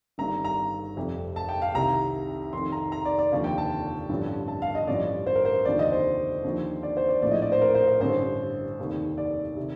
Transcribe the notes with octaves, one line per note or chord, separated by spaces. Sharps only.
G1 G2 D#3 A#5
A#5
F1 F2 C3
A5
G5
F5
C2 C3 D#3 A#5
F1 F2 D#3 C6
A#5
A#5
D5
D5
F1 D#2 D3 F3 F5
G5
A5
A1 G2 D3 F3
A5
F5
D#5
A1 G2 D3 F3 D5
C5
A#4
C5
F1 D#2 D3 F3 D5
D#5
C5
D#2 D3 F3
D5
C5
D5
A#1 A2 F3 D5
D#5
D5
C5
A#4
C5
A#4
A1 G2 D3 C5
F1 D#2 D#3
D5
C3 D#3